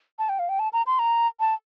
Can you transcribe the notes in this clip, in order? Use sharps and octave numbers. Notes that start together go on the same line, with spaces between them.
A5
G5
F5
G5
A5
A#5
C6
A#5
A5